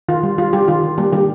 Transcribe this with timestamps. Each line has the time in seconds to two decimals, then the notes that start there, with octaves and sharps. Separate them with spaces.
0.09 D#3 F4
0.23 G3
0.38 G3 F4
0.53 G3 G4
0.68 D#3 F4
0.83 D#3
0.98 G3 A#3 G4
1.13 D#3 G3 G4